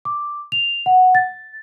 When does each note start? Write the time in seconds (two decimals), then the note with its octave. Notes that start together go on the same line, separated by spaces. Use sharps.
0.05 D6
0.52 F7
0.86 F#5
1.15 A6